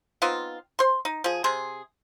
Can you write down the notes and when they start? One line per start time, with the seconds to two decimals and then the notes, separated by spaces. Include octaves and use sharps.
0.22 B3 C4 D#4 F4
0.79 C5 C6
1.05 D#4
1.24 F3 G#4
1.44 C3 G#4 C6